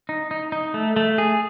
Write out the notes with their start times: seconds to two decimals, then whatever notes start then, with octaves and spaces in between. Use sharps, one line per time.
0.09 D#4
0.31 D#4
0.52 D#4
0.74 A3
0.96 A3
1.18 G#4